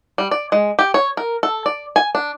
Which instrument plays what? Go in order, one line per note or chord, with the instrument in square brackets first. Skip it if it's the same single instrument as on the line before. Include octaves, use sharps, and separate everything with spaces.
[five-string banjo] G3
D5
G#3
G4
C#5
A#4
A4
D5
G#5
D4